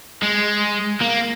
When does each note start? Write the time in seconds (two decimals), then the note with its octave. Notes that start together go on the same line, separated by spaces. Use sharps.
0.23 G#3
1.01 A#3